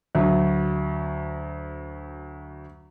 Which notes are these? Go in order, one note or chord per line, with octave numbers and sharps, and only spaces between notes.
D2 F#3